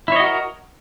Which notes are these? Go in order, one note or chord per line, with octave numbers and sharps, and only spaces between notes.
E4 F#4 A#4 C#5 D#5